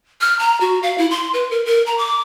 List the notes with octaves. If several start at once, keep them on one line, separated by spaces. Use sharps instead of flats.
F6
A#5
F#4
F5
E4
C6
B4
A#4
A#4
A#5
D6